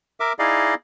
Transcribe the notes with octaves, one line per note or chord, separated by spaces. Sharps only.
A#4 E5 D6
D#4 E4 G#4 D5 D#5 F5